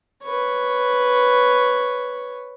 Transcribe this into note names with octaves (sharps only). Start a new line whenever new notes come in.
B4 C#5